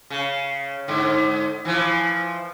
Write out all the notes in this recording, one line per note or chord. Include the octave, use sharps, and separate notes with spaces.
C#3
G#2 D3
E3 F3